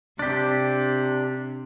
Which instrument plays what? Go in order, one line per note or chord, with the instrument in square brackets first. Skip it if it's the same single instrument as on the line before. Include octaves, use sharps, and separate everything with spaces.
[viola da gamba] C3 [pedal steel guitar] D4 G4